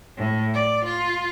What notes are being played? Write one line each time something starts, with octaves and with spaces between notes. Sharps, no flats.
A2
D5
F4